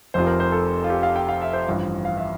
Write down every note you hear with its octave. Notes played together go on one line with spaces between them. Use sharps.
F1 F2 C3 F3 C5
A#4
C5
A4
F4
G4
F5
G5
F5
E5
C5
A1 G2 F3
F5
E5